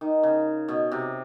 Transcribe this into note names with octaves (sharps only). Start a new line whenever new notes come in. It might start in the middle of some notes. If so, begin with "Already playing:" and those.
D#3
C#3
B2
C3